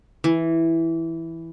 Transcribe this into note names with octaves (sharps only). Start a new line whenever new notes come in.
E3